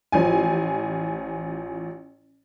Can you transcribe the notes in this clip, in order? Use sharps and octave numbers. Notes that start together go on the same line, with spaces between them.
A1 F3 G#5